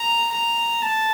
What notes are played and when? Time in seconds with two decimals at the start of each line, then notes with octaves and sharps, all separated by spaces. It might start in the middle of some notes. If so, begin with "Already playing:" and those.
Already playing: A#5
0.31 A#5
0.82 A5